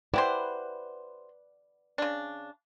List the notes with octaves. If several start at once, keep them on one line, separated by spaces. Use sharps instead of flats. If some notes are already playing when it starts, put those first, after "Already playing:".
E4 G4 B4 C5 D5 F#5
C#3 D4